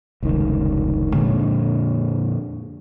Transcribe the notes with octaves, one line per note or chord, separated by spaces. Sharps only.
F1 C#2 G2 D#3
F2 A#2 D3 G#3